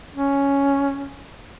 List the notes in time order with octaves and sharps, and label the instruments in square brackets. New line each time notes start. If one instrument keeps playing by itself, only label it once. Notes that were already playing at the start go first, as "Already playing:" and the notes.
[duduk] C#4